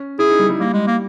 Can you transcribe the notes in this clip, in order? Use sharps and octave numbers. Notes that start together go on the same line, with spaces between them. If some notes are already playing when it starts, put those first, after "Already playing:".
Already playing: C#4
E4 G#4
D#4
G3
G3
G3 A#3
G#3
A#3